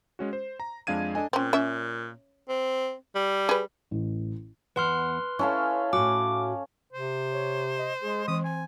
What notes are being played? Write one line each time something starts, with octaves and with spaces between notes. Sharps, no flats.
G#3 C#4 F#4
C5
A#5
F2 G#3 D4 F5 G#6 D#7
D4 A4 D#5 G#5
A#2 C4 C#4
C#4 E5
C4
G3
G#4 B4
A1
E2 B4 F#5 C6 F6
C#4 E4 A4 F5
A2 F#4 D6
C3 C5
C#5
D#5
G#3 G#4
E3 C4 D#6
G#5